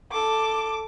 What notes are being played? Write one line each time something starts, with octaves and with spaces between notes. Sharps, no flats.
A4 D6